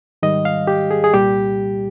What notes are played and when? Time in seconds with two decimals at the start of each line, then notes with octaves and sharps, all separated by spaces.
0.23 G#2 D#3 G3 D#5
0.45 F5
0.67 G4
0.91 G#4
1.04 G#4
1.13 C2 A#2 G3 G4